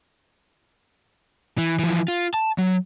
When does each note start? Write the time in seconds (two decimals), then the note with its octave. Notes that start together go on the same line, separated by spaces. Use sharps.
1.58 E3
1.79 E3 F3
2.08 F4
2.34 A5
2.58 F#3